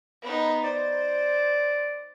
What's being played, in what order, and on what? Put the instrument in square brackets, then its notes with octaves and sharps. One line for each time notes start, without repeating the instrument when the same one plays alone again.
[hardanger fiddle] B3 D#4
[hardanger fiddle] C5 [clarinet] D5